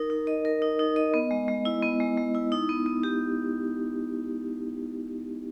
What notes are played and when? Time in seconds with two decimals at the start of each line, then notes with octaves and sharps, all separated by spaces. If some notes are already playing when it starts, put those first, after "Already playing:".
Already playing: D#4 A#4
0.10 D#4
0.27 D#5
0.45 A#4
0.62 D#4
0.79 D#4
0.96 D#5
1.14 B3
1.31 G#3
1.48 G#3
1.65 E4
1.83 B3
2.00 G#3
2.17 G#3
2.35 E4
2.52 D#4
2.69 B3
2.86 B3
3.03 G4